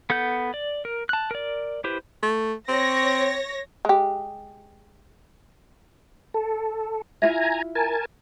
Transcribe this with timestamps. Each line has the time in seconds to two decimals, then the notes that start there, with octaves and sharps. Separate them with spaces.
0.10 B3 A4 F#5 G6
0.54 D5
0.85 A#4
1.09 A5 F#6
1.31 A#4 D5
1.84 E4 G4 B4 C5
2.23 A3
2.68 C4 C#5 A#6
3.85 G#3 G4
6.34 A4
7.22 E4 F4 E5 G#5 A#5
7.75 A#4 G#5 A5